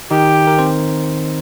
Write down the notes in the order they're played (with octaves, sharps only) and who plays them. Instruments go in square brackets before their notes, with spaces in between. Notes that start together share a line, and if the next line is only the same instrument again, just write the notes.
[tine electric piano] D#3 D#4 [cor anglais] G4
[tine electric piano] A#4
C4 C5